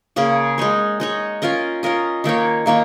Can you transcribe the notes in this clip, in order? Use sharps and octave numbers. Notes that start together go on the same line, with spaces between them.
C#3 A#3 C#4 G#4
G#3 D#4 C#5
G#3 D#4 C#5
C#4 F4 A#4 D#5
C#4 F4 A#4 D#5
D#3 A#3 D#4 C#5
D#3 A#3 D#4 C#5